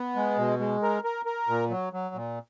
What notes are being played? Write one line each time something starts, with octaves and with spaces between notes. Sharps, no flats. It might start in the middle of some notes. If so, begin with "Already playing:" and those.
Already playing: B3
G#3
B2
G#3
A#4
A#4
A#4
A#2
F#3
F#3
A#2